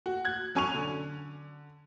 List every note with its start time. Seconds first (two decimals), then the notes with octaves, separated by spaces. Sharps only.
0.06 F#4
0.25 F#6 G#6
0.55 F#3 C#4 G#5 C#6 D#7 F7
0.75 D3